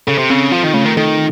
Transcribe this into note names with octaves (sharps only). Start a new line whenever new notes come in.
C#3 A4
C3
C#3 C4
F3 F4
D#3
C#3 A3
D#3
D#3 A4